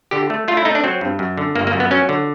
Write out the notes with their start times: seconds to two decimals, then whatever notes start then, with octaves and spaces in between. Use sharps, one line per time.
0.11 D3 G4
0.30 A3
0.48 A3 F4
0.57 E4
0.65 A3 D#4
0.75 D4
0.84 F#3 C4
1.01 G2
1.19 F#2
1.37 D3
1.55 G1 A#3
1.67 A#3
1.73 F#2
1.80 B3
1.91 F#3 C#4
2.09 D3